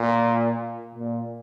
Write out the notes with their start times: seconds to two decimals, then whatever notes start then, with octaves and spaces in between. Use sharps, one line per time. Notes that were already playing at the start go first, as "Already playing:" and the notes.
Already playing: A#2
0.95 A#2